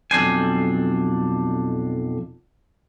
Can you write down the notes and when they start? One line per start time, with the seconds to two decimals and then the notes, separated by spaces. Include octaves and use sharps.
0.11 B1 F2 D4 C5 G#5